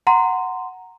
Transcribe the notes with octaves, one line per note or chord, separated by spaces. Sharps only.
F#5 A#5 C6